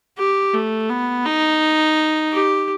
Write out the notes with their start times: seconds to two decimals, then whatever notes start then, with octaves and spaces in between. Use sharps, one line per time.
0.18 G4
0.53 A3
0.89 B3
1.26 D#4
2.33 G4